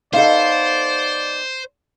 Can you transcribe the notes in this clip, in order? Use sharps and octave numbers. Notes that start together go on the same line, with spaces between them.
B3 D#4 A4 C5 D5 F5